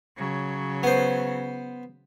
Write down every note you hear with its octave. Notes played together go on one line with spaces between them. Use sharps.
C#3 F#3
B3 C5